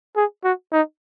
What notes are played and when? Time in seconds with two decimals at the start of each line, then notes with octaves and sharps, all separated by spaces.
0.16 G#4
0.44 F#4
0.73 D#4